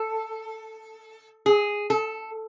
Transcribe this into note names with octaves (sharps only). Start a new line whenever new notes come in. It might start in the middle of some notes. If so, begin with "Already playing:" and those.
Already playing: A4
G#4
A4